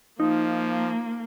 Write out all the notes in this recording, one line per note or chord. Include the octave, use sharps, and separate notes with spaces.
F3 A#3 D#4